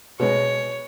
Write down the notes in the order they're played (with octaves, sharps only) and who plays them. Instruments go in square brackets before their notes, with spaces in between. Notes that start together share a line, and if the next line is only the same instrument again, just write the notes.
[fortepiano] B2 G#3 [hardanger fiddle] C#5